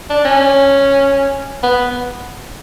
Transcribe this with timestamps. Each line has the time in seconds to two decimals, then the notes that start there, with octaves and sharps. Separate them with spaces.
0.10 D4
0.25 C#4
1.63 B3